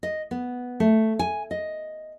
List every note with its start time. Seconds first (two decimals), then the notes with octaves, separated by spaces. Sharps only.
0.03 D#5
0.31 B3
0.80 A3
1.19 G#5
1.51 D#5